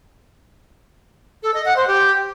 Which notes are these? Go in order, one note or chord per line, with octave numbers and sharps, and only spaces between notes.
A4
D#5
F#5
C5
G4